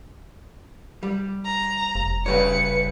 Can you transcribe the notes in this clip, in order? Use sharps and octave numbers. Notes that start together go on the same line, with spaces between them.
G3
A#5
F1
C#3 G3 B4 C#5 C#7